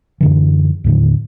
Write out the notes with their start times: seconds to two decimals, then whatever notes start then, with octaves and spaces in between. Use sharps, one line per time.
0.21 F#2 D3 E3
0.84 D#2 A2 D3